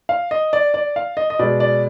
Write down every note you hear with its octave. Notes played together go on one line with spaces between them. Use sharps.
F5
D#5
D5
D5
F5
D#5
D#5
B2 G#3 D5
D5